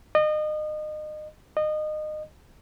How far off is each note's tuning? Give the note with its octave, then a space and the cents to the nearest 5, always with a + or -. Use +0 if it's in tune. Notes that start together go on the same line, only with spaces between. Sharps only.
D#5 -30
D#5 -25